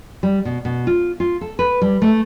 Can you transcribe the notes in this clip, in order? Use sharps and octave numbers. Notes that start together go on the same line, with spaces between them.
G3
B2
B2
F4
F4
A4
B4
G3
A3